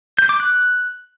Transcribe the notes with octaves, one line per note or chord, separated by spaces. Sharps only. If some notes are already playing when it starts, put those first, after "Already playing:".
G6
D6
F#6